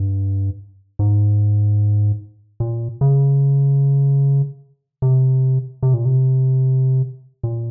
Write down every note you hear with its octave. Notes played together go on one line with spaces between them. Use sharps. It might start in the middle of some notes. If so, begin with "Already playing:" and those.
Already playing: G2
G#2
A#2
C#3
C3
C3
A#2
C3
A#2